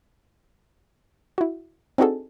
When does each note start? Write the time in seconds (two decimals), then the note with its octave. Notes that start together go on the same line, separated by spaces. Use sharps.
1.38 E4 F#4
1.98 C4 D4 D#4 F#4 G#4 A4